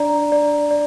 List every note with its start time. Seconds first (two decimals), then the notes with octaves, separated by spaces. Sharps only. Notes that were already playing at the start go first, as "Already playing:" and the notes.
Already playing: D4 D5 A#5
0.32 D5
0.71 D5